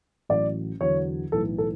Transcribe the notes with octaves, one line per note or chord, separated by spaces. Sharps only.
A1 A2 F#3 D5
E2 D3 F#3 C#5
B1 A2 E3 A4
A4